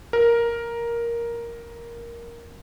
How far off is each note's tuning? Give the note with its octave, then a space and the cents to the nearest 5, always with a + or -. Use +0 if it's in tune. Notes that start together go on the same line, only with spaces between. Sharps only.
A#4 +5